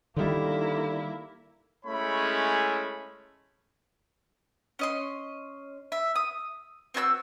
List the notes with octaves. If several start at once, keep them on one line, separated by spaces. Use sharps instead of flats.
D3 D#3 G3 A#3 E4
G#3 A3 C#4 E4 C#5 B5
C#4 D#5 C6
E5
D#6
C4 F#4 G#5 E6